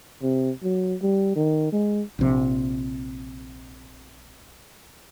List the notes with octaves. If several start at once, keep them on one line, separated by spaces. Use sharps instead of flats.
C3
F#3
G3
D#3
G#3
A#1 C3